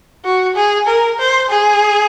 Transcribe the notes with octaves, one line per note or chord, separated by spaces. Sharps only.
F#4
G#4
A#4
C5
G#4